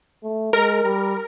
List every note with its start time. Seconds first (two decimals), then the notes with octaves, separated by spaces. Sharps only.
0.23 A3
0.53 G#3 A#4
0.83 G3